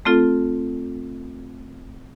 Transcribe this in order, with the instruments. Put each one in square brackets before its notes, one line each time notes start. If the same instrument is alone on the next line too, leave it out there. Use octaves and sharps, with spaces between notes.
[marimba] A3 C4 F4 A4